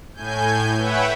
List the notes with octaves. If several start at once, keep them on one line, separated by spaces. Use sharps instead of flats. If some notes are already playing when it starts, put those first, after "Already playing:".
A2 G#5 G6
B4 C#5 E5 F#5 G5 B5